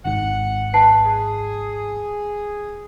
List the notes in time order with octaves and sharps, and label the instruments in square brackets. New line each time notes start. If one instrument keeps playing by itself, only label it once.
[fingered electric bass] G#1 G#2 [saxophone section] F#5
[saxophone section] B4 [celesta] A5 C7
[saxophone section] G#4